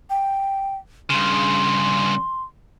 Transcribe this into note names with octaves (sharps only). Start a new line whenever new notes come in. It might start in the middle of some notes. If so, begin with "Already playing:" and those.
G5
G2 C#3 C6